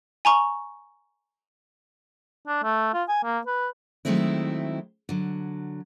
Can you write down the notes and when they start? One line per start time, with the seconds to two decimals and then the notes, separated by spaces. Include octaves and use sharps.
0.25 G#5 A#5 C#6
2.47 D4
2.64 A3
2.94 F4
3.08 G#5
3.24 A#3
3.47 B4
4.05 D#3 F#3 G#3 A3 C4 E4
5.09 D3 F#3